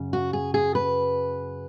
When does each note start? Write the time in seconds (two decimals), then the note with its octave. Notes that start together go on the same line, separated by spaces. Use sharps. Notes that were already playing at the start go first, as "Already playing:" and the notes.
Already playing: F#2 C#3
0.13 F#4
0.33 G#4
0.54 G#4
0.75 B4